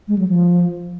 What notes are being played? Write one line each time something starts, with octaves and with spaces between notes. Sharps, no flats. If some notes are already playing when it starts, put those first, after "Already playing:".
G#3
F#3
F3